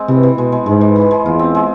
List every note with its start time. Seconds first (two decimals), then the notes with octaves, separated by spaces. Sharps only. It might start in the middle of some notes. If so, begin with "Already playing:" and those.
Already playing: G#3 C4
0.08 C3 E3
0.23 E3
0.37 B2 G#3
0.52 G#3
0.66 G#2 G#3
0.81 E3
0.96 E3
1.11 G#3
1.25 E2 F4
1.39 C4
1.55 G#3